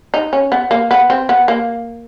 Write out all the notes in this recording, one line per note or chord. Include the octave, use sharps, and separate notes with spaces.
D#4
C#4
B3
A#3
B3
C4
B3
A#3